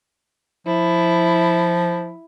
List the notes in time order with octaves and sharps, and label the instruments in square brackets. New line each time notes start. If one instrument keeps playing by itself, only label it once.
[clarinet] F3 [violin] E4